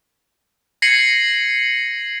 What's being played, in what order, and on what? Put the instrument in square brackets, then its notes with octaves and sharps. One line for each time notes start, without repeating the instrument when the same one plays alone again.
[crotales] G#6 A#6 C7 C#7 D#7 F#7